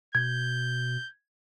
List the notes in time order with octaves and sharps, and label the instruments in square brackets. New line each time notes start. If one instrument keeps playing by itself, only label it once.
[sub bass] B2 [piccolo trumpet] G6 [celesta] G#6